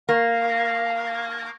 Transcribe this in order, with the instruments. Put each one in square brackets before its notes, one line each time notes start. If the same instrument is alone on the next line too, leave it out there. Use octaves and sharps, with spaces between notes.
[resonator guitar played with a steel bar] A#3 [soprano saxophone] F5